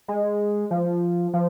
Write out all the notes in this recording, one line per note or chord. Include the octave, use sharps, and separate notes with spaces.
G#3
F3
F3